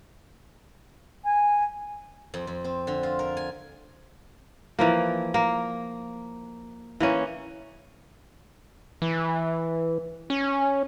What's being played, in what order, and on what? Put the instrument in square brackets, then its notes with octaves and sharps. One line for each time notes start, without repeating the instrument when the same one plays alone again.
[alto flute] G#5
[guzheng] F2
F2
C4
D3
F4
A#4
G#5
[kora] E3 F3 A#3
A#3
E3 A#3 C#4
[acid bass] E3
C#4